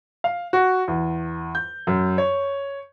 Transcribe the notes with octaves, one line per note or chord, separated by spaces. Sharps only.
F5
F#4
E2
G6
F#2
C#5